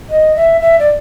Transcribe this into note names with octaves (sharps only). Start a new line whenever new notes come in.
D#5
E5
E5
D5